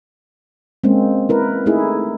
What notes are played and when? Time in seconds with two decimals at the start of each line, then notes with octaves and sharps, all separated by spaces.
0.84 G#3 A#3 C4 C#4
1.29 E4 A#4 B4
1.66 A3 D#4 E4 G#4